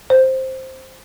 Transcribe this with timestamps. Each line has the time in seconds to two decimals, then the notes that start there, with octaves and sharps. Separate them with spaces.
0.10 C5